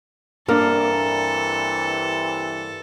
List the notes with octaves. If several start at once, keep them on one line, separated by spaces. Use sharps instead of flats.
G2 C3 E3 A#3 D4 A4 A#4